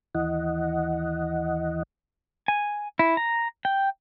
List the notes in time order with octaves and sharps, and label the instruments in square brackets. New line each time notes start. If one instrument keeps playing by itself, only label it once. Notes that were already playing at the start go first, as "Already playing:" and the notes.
[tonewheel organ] D#2 E3 D#5 F#5
[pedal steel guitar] G#5
E4
A#5
G5